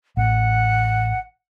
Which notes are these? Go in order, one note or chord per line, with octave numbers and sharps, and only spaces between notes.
A1 F#5